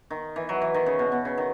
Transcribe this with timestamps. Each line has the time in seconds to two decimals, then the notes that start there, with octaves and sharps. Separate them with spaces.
0.10 D#3
0.36 E3
0.49 F#3
0.62 E3
0.74 D#3
0.86 C#3
0.99 B2
1.12 B2
1.25 C#3
1.38 D#3